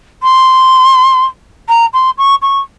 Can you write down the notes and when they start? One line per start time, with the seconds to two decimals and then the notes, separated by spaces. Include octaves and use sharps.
0.23 C6
1.69 A#5
1.93 C6
2.18 C#6
2.42 C#6